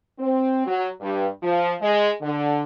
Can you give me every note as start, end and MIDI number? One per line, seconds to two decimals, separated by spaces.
0.19 0.62 60
0.66 0.87 54
1.00 1.26 43
1.42 1.73 53
1.80 2.08 56
2.20 2.62 50